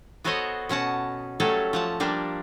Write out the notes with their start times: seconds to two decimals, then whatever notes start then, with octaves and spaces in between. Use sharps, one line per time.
0.24 B3 F#4 A4 C5 C#5 D#5
0.69 B2 C#4 F#5 A5
1.40 F#3 G3 A3 C#4 A4
1.73 F3 F#5 A5
2.00 F3 G3 A#3 D4